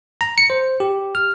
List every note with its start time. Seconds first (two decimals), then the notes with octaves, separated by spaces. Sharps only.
0.21 A#5
0.38 C#7
0.50 C5
0.80 G4
1.15 F6